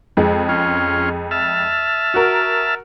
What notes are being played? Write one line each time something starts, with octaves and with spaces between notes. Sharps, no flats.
F2 G#3
C#4 F4
E5 A5 F6
F#4 A#4